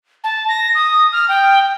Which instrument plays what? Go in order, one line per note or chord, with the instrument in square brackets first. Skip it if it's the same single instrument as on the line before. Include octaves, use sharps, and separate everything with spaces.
[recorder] A5
A#6
D#6
F6
G5